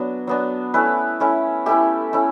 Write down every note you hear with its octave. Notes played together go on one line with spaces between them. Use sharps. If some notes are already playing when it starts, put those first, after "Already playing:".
Already playing: F#3 B3 D4
F#3 B3 D4
A3 C#4 E4 B4
A3 C#4 E4
A3 C#4 E4 G4
A3 C#4 E4